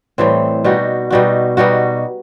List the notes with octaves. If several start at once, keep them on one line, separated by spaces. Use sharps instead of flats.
A2 E3 G3 C4
B2 G3 D#4 F#4
B2 G3 D#4 F#4
B2 G3 D#4 F#4